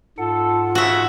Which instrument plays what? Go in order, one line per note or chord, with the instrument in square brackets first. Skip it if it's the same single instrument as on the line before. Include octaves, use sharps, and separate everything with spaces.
[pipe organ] G#2 F#5 [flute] F4 [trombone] A4
[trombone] C#3 [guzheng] F#4 E5